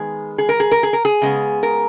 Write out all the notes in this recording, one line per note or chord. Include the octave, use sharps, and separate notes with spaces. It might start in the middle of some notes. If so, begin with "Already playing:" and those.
Already playing: D#3 G#3 B3 G#4
G#4
A#4
G#4
A#4
G#4
A#4
G#4
C#3 G#3 B3
A#4